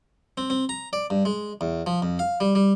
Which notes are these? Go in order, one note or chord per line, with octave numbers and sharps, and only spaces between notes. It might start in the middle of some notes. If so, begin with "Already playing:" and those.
C4
C4
A#5
D5
G2
G#3
E2
F3
F2
F5
G3
G3